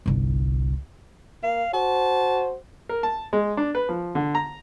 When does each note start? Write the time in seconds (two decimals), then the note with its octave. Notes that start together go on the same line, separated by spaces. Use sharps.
0.06 G1 C2
1.44 A#3 F5
1.73 F#4 C5 A5
2.89 A#4
3.03 A5
3.33 G#3
3.57 D4
3.75 B4
3.89 F3
4.15 D3
4.35 A#5